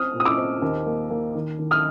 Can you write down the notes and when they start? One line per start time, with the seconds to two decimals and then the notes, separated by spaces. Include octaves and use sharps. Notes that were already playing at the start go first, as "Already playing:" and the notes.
Already playing: C4 C#4 D#6 F6
0.14 A#2
0.20 D#6
0.25 D6 E6
0.38 C4
0.62 D#2
0.86 A#3
1.10 A#3
1.35 D#3
1.59 D#3
1.71 D#6 F6